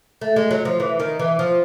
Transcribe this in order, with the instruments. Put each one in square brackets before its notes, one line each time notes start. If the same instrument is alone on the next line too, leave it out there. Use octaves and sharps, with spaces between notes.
[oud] A3
G#3
F#3
F3
E3
D#3
E3
F3